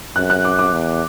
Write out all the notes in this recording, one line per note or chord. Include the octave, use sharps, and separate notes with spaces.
F#2 F#6
F#6
D6
D6
E2